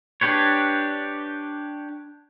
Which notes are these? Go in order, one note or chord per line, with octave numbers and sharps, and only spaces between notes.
D4 G4 B4 C#5